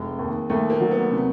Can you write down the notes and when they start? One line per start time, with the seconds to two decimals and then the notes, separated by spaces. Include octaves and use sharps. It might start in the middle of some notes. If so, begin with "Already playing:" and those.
Already playing: F1 G#3
0.19 D#2
0.50 D#2 A3
0.70 A#3
0.80 F#3
0.91 B3
1.11 C3